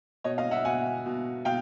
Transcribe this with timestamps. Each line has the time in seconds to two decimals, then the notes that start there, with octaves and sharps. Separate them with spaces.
0.24 B2 C#5 D#5
0.38 D#5 F5
0.51 E5 F#5
0.65 B2 F#5 G#5
1.06 B2
1.45 B2 F5 G5